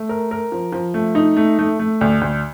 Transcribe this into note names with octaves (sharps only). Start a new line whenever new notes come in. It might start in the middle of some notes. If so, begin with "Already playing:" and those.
Already playing: A3
A#4
A#4
F3
F3
A3
D#4
A3
A3
A3
D2
D2